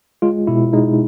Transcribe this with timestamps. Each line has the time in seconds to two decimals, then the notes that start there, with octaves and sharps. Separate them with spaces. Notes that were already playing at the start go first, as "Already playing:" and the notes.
0.22 G#3 F4
0.47 B2 E4
0.73 G#3 D#4